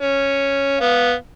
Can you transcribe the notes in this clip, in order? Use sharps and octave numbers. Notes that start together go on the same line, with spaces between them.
C#4
B3 F5